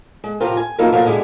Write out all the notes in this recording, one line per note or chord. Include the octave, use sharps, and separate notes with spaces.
G#3
A2 C3 F3 F4 A#4 G5
G#5
F3 F#3 A#3 D#4 E4 A#4
B2 F3 F#3 A#3 A4 A#4
B2 D3 G#3 E4 G4 G#4